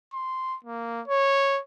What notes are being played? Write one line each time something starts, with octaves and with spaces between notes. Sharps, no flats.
C6
A#3
C#5